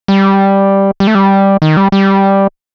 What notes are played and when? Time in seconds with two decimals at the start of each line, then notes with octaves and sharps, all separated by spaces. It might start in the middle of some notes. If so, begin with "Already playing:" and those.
0.08 G3
1.00 G3
1.07 A3
1.15 G3
1.62 D#3
1.77 G3
1.92 G3